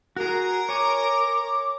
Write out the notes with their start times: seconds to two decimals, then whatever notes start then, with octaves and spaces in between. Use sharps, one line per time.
0.16 F#4 G#4 A#4 A#5
0.69 C#5 G#5 D6